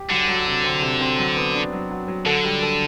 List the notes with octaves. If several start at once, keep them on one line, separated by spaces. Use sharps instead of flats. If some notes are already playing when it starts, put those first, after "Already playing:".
Already playing: G4
D3 F#3
F#3
C3
C4
C3
C4
F#3
B3
D4
F#3
F#3
F#3
D3 A4
G3
A4